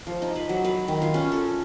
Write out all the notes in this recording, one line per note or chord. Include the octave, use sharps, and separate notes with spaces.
F3
D#4
B4
F#3
B4
D#3
F4
C#4
A4